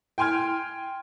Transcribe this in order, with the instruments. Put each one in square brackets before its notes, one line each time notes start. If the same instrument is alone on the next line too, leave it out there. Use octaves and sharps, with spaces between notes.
[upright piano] G5 G#5 C6 F6 G#6